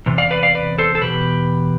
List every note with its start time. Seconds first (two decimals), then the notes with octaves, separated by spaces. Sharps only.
0.06 E2 C3
0.18 D5 F5
0.31 B4 D5
0.43 D5 F5
0.55 B4 D5
0.78 A4 C5
0.95 A4
1.02 E2 B2 G4 B4